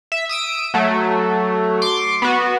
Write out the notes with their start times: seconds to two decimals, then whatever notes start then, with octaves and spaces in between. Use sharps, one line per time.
0.12 E5
0.29 D#6 E6 D7
0.74 F#3 A3
1.82 C6 D6
2.22 B3 F#4